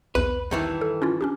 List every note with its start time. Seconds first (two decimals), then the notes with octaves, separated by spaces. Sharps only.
0.15 B1 E2 B4
0.51 G2 D#3 E3
0.81 A4
1.02 C#4 E4 F4
1.21 C#4 D4 G4